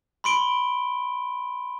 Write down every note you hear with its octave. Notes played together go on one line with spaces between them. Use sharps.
B5 C6 D7 G7